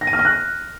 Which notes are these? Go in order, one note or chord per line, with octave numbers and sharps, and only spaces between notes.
A#6
D#7
F6
A#6
F#6